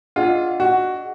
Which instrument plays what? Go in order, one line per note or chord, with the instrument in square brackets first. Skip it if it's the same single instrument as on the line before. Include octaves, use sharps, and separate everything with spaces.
[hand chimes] D4 G#4 D#5 F#5 [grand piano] F4
[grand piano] F#4